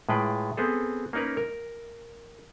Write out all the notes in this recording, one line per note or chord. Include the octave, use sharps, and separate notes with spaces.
A2 G#3 F4 B4 G5
B3 C4 G#4 A4
A#3 C#4 D#4 A#4 B4
A#4